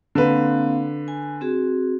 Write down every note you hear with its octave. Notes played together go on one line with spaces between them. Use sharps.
D3 A#3 C4 B4 F5
G#5
C4 F#4 G#4